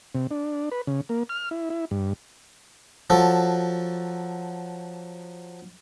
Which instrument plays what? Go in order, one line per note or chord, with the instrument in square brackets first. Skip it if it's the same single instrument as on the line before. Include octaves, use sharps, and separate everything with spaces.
[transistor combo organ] C3
D4
B4
C#3
A#3
F6
E4
E4
G2
[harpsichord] F3 F#3 A4